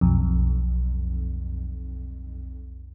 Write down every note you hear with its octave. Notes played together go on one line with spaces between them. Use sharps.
B1 F2